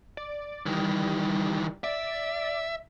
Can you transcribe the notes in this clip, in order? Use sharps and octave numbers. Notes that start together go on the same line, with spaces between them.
D5
D#3 E3 G3
D5 E5